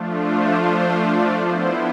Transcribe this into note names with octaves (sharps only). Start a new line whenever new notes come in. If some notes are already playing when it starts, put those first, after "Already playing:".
Already playing: F3 A3 D4 F4
C5
C5
D5
F3 B3 E4 C5